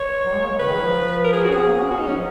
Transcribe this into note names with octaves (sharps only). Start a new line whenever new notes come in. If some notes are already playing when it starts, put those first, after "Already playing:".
Already playing: C#5
F#3
G#3
A#3
G#3
C#3 B4
D#3
F#3
F3
A#4
G#4
F#4
C#4 G#4
B3
A#3
C#4
B3 F#4
D#4
F#3 C#4
F3